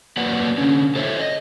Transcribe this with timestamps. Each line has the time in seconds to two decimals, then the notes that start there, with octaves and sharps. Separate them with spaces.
0.17 F#3 A#3 B4 D5 F#5
0.58 D3 C#4
0.95 A4 C5 C#5 E5
1.19 D#5